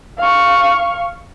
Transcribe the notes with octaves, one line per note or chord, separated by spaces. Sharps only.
F5 C#6